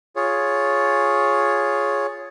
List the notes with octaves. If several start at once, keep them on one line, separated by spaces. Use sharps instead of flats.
F4 G#4 C#5